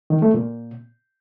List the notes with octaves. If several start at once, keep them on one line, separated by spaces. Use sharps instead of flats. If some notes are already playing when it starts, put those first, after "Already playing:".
D#3
A3
A#2